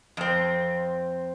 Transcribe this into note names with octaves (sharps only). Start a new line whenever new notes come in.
F2 C4